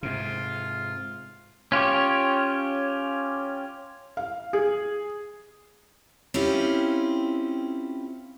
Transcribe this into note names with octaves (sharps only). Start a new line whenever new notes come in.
G#2 C3 F4
C#4 F4 G4 C#5
F5
G#4
C4 C#4 E4 F4 G4